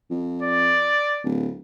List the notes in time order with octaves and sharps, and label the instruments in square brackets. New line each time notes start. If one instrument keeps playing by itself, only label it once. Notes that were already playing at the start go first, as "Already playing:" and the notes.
[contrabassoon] F2
[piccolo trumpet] D5
[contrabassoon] D1